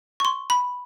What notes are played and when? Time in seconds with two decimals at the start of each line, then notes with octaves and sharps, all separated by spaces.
0.20 C#6
0.25 C6
0.50 B5